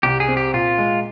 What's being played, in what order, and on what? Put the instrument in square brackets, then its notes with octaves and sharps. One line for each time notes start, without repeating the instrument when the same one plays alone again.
[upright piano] C2 [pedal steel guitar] G4
[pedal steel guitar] G#4
[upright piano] C4
[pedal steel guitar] G4
[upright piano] A#2 [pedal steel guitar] F4
[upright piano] G#3